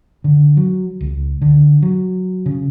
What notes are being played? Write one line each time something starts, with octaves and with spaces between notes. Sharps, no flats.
D3
F#3
C#2
D3
F#3
C#3